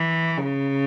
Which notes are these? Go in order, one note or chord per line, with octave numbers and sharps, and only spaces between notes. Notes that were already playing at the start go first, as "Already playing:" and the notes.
Already playing: E3
C#3